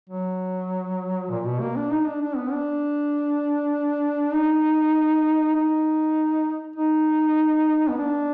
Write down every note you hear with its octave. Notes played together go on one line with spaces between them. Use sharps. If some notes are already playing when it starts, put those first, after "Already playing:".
F#3
A#2
B2
A#3
D4
D#4
D4
D4
B3
D4
D#4
D#4
D#4
B3
D4